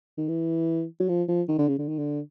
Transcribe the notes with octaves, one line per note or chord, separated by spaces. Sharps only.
D#3
E3
F#3
F3
F3
D#3
D3
C#3
D3
D#3
D3